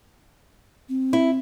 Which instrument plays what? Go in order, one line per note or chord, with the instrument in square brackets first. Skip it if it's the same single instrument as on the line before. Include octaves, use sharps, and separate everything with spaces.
[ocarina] C4
[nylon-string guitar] E4